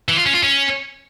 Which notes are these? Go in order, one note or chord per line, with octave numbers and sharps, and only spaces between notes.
E3
F4
C#4
F4
C#4